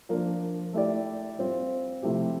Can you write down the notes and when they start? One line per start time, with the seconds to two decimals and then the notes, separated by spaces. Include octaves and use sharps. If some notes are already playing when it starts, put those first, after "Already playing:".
0.09 F3 A#3 D4
0.73 A3 E4 G4 D5
1.38 G3 C4 F4
2.02 C3 F3 A3 E4 G4